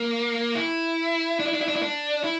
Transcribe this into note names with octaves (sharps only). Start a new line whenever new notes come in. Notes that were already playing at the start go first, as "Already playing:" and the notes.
Already playing: A#3
E4
D4
E4
D4
E4
D4
E4
D4
E4